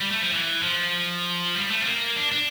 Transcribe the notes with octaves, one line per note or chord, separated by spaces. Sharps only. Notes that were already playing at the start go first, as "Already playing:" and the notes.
G3
A3
F3
E3
F3
G3
A3
C4
A#3
D4
D4